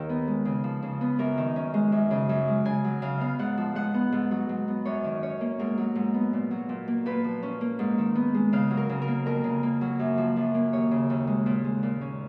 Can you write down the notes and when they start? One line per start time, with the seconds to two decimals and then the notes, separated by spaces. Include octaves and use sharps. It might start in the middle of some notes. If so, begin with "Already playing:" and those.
Already playing: D#2 D#3 A#4
0.09 B3
0.27 G#3
0.45 C#3
0.64 F3
0.83 C#3
1.01 B3
1.19 F#2 A#4
1.38 D#3
1.56 C#4
1.74 G#3
1.92 F#2
2.11 C#3
2.29 F#2
2.48 G#3
2.65 C#3 G#5
2.84 F#3
3.02 C#3 F5
3.20 B3 F5
3.39 G#2 F#5
3.58 F3
3.75 G#2 F#5
3.94 B3
4.12 G#2
4.31 F#3
4.49 G#2
4.68 B3
4.85 F#2 C#5
5.04 D#3
5.23 C#4 C#5
5.41 A#3
5.59 G#2 A#4
5.78 F#3
5.96 G#2
6.14 B3
6.33 A#2
6.51 F#3
6.69 A#2
6.87 A#3
7.06 A#2 B4
7.24 F3
7.43 C#4
7.61 A#3
7.79 G#2
7.98 D#3
8.15 B3
8.34 G#3
8.53 C#3 F5
8.71 F#3
8.77 A#4
8.89 C#3
9.02 A#4
9.08 A#3
9.26 F2 A#4
9.44 C#3
9.63 A#3
9.81 F#3
9.99 F#2
10.18 F3
10.36 F#2
10.54 A#3
10.73 D#2 C#5
10.91 C#3
11.10 D#2
11.27 G#3
11.46 A#2
11.65 G#3
11.83 A#2
12.01 C#4